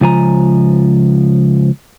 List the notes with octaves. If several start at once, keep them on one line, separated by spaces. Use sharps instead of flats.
C#2 F3 G#5 A#5